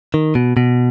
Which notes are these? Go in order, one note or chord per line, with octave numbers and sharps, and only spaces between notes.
D#3
B2
B2